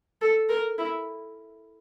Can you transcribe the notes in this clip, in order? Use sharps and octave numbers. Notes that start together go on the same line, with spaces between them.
A4
A#4
E4